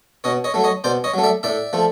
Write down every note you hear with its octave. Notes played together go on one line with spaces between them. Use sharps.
B2 C#5 D#5
C#5 D#5
F#3 A3
C#5 D#5
B2 C5 D5
C#5 D#5
F#3 A3
D5 E5
A2 D5 E5
F3 A3